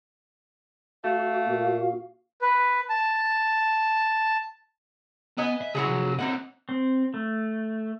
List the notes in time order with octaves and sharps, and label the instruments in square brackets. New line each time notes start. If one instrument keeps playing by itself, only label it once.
[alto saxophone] A3 [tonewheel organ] F#4 [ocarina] F5
[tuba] A#2
[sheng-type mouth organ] B4
A5
[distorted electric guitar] B3 [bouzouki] B4 D#5 G#5
[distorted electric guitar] E5
[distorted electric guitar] C#2 E4 [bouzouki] F#3 F#4 G#4
[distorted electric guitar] C3 F3
[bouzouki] E3 D#4 F#5 [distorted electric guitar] A#3 C4
[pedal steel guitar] C4
A3